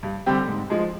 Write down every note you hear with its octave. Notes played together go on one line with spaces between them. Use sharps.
G2
D3 G3 C4 G4
G#2
F3 G#3